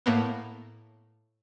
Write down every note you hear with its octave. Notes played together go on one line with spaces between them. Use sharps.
A2 A#3 B3